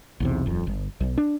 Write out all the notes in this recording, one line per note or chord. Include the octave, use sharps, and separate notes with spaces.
B1 E2 C3
D#1 F2
G1
B1
D4